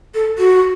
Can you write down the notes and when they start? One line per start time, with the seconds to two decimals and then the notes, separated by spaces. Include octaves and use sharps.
0.14 A4
0.38 F#4